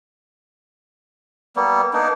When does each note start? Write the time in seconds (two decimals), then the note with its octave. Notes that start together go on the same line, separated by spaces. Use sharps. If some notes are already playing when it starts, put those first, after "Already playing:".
1.56 G3 A#3 B3
1.93 A#3 B3 D4 D#4